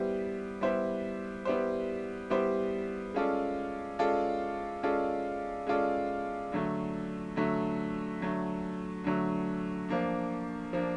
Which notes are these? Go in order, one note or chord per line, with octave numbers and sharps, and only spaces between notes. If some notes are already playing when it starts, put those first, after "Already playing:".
Already playing: G3 B3 E4 G4 C5
G3 B3 E4 G4 C5
G3 B3 E4 G4 C5
G3 B3 E4 G4 C5
G#3 C#4 F4 A4 D5
G#3 C#4 F4 A4 D5
G#3 C#4 F4 A4 D5
G#3 C#4 F4 A4 D5
D3 F#3 A3
D3 F#3 A3
D3 F#3 A3
D3 F#3 A3
F3 A#3 D4
F3 A#3 D4